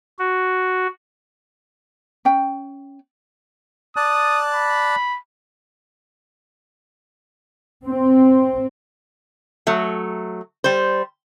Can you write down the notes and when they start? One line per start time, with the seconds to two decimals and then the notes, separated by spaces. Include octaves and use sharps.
0.19 F#4
2.25 C#4 G5
3.96 D5 A5 D#6 F#6
4.54 B5
7.86 C4
9.67 F#3 A3
10.64 G3 C5